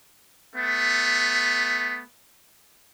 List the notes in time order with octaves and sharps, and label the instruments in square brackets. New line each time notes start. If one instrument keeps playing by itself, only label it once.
[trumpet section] A3 B3